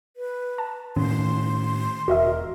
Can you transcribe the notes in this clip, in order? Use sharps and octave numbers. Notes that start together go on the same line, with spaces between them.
B4
A5
A2 D#3 C#4 C6
E1 F#4 A#4 D#5 E5